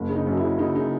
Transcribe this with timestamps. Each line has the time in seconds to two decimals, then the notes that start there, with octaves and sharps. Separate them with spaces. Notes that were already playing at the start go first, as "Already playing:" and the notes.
Already playing: F#1
0.09 C#3
0.16 D#4
0.26 F#2
0.32 F#4
0.37 E4
0.42 C#3
0.59 C#3 D#4
0.75 C#3 D#4